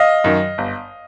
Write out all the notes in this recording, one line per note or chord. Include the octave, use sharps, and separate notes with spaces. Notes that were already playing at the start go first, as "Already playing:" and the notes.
Already playing: D#5 F5
F#2 D#3
G1